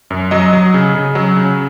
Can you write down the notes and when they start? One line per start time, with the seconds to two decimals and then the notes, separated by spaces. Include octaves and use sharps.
0.10 F#2
0.31 F#3 D#5
0.53 F#3
0.74 C#3
0.95 C#3
1.15 F#3
1.36 C#3